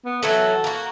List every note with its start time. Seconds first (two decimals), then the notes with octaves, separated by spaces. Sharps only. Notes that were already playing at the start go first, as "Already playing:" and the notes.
0.05 B3
0.23 E3 F#3 F#4 A4
0.64 A#3 F#4